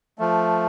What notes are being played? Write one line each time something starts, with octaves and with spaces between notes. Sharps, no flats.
F3 A3